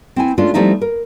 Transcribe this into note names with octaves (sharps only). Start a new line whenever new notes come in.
C4 E4 G#5
G#3 A3 C#4 D4 F4
F3 G3 A3 C4 D#4 E4
A#4